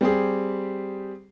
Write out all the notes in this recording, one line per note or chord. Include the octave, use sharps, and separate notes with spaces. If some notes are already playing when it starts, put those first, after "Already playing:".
G3 C4 G4 G#4